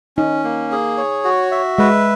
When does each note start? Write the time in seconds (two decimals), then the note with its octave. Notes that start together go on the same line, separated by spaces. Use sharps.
0.17 C#4 D#4
0.44 A#3
0.72 G#4
0.97 C#5
1.25 F#4
1.51 E5
1.78 G#3 B4